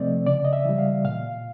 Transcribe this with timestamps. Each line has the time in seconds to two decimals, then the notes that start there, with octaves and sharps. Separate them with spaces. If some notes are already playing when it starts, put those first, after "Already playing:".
Already playing: C3 F3 A3 C4 D5 D#5
0.26 C#3 D5
0.44 D#5
0.53 E5
0.65 E3 G3
0.78 F5
1.04 A#2 F5